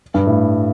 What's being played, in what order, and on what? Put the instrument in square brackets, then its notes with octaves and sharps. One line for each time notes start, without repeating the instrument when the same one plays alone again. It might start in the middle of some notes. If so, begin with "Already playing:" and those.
[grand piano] G2
A2